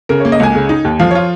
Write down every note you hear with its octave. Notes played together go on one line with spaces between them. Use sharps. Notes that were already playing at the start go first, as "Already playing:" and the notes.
C#3 A#4
A#3 C#5
D#5
C#2 G#5
C#3
D#4
D#2
F3 F5
F4 C#5